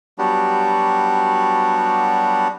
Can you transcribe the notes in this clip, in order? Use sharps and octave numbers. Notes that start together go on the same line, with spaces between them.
F#3 G3 B3 D4 F#4 G4